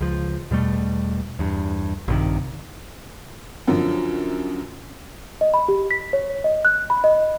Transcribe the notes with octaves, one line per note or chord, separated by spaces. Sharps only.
C#2 F3
E2 B2 G3 A3
E2 G2
A#1 G2 C3 D#3
F#2 D3 F3 F#3
D#5
B5
G4
B6
C#5
D#5
F#6
B5
D#5